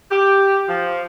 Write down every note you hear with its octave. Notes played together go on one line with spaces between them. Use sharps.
G4
F3